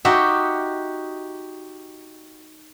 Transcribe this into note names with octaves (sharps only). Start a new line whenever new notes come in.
D#4 F#4 G4 E5